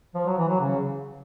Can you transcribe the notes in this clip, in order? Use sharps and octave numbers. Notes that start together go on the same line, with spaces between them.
F3
F#3
E3
F#3
C#3